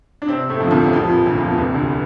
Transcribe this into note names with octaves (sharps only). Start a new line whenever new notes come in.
D4
C3 C4
A2 A3
F2 F3
D3
C2 C3
F2 F3
F2 F3
A#1 A#2
D2 D3
F2 F3
E2 E3
C2 C3
D2 D3
E3